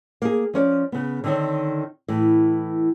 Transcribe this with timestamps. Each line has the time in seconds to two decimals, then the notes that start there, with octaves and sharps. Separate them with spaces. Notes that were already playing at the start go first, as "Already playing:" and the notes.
0.22 A#3 G#4
0.53 F3 C#4 C#5 D5
0.92 C#3 B3
1.24 D3 D#3 C4 D#4 C#5
2.08 A2 E3